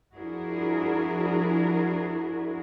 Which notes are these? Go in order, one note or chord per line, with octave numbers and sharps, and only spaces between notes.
F3 D4 E4 F#4 G#4 A#4